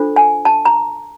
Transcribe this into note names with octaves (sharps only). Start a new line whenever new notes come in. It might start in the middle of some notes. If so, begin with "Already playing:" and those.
Already playing: D4 F4 A4 C5
G#5
A5
A#5